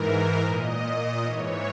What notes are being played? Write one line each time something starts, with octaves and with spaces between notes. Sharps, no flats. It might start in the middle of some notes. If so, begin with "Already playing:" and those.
Already playing: G#2 E3 A#4
A#2 D#5
G#2 E3 C#5